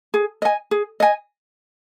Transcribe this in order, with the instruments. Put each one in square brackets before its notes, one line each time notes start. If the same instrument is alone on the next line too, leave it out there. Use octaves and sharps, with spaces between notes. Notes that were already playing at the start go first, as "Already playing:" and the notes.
[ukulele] G#4
D#5 G#5
G#4
D#5 G#5